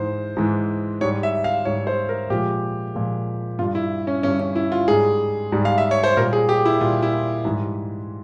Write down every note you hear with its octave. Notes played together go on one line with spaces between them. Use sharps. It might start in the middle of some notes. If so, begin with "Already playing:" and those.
Already playing: G#2 E3 G#3 C5
G#2 E3 G#3
G#2 G3 C#5
E5
F5
G#2 G3 C#5
C5
A#4
A#2 F3 G#3 G4
A#2 F3 G#3
G2 G3 F4
E4
C#4
G2 G3 C#4
C#4
E4
F4
G#2 G3 G#4
G#2 G3
F5
E5
C#5
C5
A#2 G3 A#4
G#4
G4
E4
A#2 G3 F4
E4
G#2 E3 G3